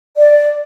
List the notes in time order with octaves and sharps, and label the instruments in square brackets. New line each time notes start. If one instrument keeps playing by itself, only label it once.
[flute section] D5